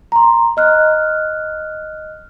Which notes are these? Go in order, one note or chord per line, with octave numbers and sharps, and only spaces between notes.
A#5 C6
D#5 F6 F#6